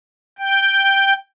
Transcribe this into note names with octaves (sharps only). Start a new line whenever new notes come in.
G5